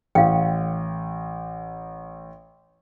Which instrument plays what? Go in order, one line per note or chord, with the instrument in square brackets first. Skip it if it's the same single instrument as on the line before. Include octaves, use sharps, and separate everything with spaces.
[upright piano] A1 [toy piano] F5 G5